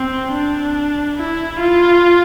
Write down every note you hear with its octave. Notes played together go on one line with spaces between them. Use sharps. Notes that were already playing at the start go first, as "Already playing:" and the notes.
Already playing: C4
D4
E4
F4